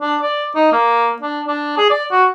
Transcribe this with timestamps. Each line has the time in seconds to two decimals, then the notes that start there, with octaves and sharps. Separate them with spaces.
0.01 D4
0.22 D5
0.55 D#4
0.72 A#3
1.22 D4
1.48 D4
1.78 G#4
1.90 D5
2.12 F#4